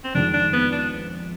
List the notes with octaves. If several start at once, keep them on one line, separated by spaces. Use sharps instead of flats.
C4
F2 D#3 G#3 D4
D4
B3
D4